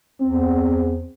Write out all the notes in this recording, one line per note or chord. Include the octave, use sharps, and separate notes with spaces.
E2 C4